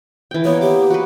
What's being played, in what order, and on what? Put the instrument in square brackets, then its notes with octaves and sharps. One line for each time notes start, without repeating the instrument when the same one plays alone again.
[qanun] E3 G5
[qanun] A#3 B3 [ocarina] C#5
[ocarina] G4 [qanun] D6
[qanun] F#4 B4